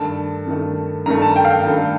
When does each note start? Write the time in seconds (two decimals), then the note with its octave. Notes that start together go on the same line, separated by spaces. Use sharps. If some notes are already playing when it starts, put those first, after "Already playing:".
Already playing: G2 D#3 A3 A5
0.46 G2 D#3 A3
1.06 G2 D#3 A3 A#5
1.22 A5
1.36 G5
1.45 F5
1.50 G5
1.66 G2 D#3 A3